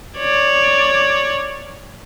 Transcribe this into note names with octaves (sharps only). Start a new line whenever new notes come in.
C#5 D5